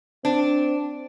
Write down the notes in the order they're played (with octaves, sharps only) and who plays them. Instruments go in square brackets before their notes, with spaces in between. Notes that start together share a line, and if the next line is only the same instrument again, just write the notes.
[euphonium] C4 [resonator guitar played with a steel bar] D4